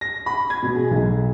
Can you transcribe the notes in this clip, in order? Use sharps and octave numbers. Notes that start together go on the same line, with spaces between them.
A#6
B5
G#6
B2
G#4
B1